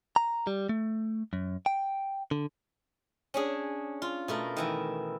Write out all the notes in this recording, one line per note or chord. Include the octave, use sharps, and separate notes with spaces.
A#5
G3
A3
F#2
G5
D3
C#4 D4 G#4
F4
B2 A3 A#4
D#3 E3 E4